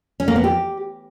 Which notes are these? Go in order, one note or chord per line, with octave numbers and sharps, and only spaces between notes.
C#4
A#3
B3
G4